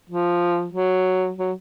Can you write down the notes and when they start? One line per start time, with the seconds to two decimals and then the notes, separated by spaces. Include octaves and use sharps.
0.10 F3
0.74 F#3
1.38 F#3